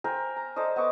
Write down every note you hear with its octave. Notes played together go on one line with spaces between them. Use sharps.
A#4 C5 G5 G#5
A#5
A4 C5 D5 D#5
B3 D#5 C#6 D6